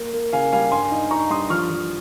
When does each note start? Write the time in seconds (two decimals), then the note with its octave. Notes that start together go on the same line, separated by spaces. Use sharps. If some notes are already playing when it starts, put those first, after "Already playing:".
Already playing: A#3
0.13 A#3
0.33 C#3 F5 G#5
0.53 G3 F5 G#5
0.72 G2 G#5 C6
0.91 D#4
1.11 D#4 A#5 C#6
1.30 G2 C6 D#6
1.50 F3 C#6 F6
1.70 F3